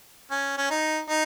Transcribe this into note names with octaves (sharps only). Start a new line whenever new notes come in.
C#4
C#4
D#4
D#4